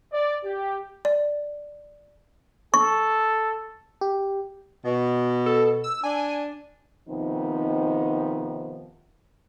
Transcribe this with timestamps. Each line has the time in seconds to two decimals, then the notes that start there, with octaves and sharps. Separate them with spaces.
0.13 D5
0.44 G4
1.05 D5
2.74 A4 C#6
4.01 G4
4.85 B2
5.46 A4
5.84 E6
6.04 D4 G#5
7.09 C3 D#3 F3 B3 C4 D#4